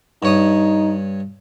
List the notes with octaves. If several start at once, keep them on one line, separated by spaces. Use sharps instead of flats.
G2 D#4 C#5 D#6